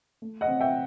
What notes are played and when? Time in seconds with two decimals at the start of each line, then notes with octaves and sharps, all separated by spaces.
0.22 A3
0.41 D#5 F#5
0.48 C4
0.60 E5 G5